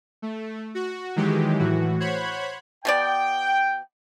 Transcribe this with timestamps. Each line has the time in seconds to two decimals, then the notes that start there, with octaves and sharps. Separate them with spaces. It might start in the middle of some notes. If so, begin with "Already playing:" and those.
0.22 A3
0.75 F#4
1.16 D#3 E3 F#3 G#3 G4
1.59 A2 E3 F#4
2.00 C5 C#5 F#5 B5 F#6 G#6
2.85 B2 B3 D5 G5